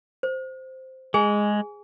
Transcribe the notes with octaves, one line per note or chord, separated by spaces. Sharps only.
C5
G#3 G#4 G#5